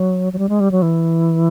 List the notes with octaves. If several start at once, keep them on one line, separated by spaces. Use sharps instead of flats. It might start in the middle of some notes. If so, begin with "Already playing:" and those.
Already playing: F#3
F#3
G3
G#3
G3
F#3
E3